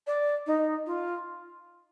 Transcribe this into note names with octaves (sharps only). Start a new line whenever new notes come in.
D5
D#4
F4